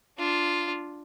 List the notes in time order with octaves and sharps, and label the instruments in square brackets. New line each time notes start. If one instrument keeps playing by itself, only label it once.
[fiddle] D4 F4